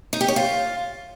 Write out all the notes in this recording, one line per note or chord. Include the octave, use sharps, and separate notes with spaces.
D#4
G4
C#5
F4